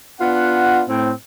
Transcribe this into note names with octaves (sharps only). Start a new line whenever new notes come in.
B3 D4 F4 F#5
A2 C4